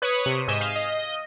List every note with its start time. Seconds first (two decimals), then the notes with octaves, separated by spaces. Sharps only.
0.02 B4 C#5 B5 C#6 D#6
0.26 C3
0.48 G#2 D#5 G#5 G6 B6 E7
0.61 F5
0.76 D#5